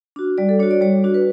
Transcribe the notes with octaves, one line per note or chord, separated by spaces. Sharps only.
D4 F#4
G3 D5
A4
D4 F#4 C#5
D5
G3 C#5
D4 F#4
B4